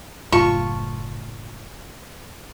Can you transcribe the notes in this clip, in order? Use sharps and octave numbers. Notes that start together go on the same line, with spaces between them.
F#1 A2 F4 A5 C#6